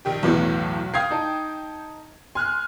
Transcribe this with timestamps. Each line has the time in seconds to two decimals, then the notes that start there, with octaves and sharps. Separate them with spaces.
0.05 A#1 D#3 G4
0.23 B1 E2 A2 E3 F#4
0.94 F5 G5 D#6 G#6 C7
1.11 D#4 A5
2.35 G#5 C6 F6 F#6